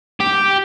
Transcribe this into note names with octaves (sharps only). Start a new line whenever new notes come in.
G4